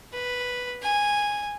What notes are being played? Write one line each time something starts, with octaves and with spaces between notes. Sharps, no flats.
B4
G#5